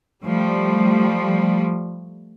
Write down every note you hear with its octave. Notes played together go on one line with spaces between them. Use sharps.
F3 G3 A3